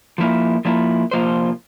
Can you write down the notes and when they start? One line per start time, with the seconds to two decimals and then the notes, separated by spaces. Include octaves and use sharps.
0.18 F3 A#3 E4
0.65 F3 A#3 E4
1.11 C3 F3 A#3 F4 C5